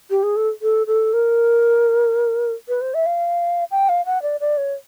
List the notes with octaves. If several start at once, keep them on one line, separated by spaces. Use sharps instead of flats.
G4
G#4
A4
A4
A4
A#4
B4
C5
E5
F5
G5
F5
F#5
D5
D5
C#5